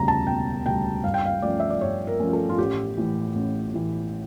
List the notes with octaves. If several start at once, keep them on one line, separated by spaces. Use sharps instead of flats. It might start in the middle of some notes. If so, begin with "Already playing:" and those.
Already playing: E1 D2 C#3 G3 A#5
A5
E1 G5
D2 C#3 G3 G5
G2 F5
G5
F5
F3 A3 C#4 D5
E5
D5
G2 C#5
A#4
F3 A3 C#4
A4
F4
A1 G4
A2 E3
A1
A2 E3